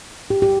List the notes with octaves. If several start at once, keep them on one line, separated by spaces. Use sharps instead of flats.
G4
G4